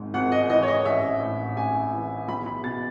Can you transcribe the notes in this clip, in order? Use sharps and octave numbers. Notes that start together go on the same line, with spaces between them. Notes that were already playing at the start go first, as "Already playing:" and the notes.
Already playing: G#1 G#2
G#1 F#5
D#5
E3 D#5
C#5
D#5
A1 E5
A2
A1 G#5
E3
B1 B5
B5
B2 A6